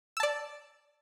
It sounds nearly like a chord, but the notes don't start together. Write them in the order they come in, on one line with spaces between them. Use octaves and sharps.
E6 A5 D5